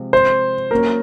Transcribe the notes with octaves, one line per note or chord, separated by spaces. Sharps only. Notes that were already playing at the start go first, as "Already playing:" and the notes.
Already playing: C3 F3 G#3 C4
C5
F#3 A#3 C#4 F#4 A#4 C#5